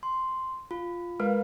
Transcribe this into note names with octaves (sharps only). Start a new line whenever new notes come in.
C6
F4
G#3 A#4 B4 F5